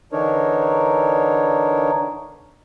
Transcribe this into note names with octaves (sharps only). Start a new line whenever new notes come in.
D3 E3 D4 D#4 A#4 C#5